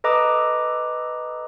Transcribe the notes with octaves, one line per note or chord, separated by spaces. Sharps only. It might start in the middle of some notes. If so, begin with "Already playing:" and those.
A4 B4 D#5 A#5 D6 D#6